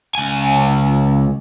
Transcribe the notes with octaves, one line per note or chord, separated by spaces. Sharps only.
C#2 G#5